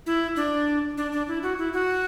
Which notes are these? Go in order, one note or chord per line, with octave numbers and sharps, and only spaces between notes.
E4
D4
D4
D4
E4
F#4
E4
F#4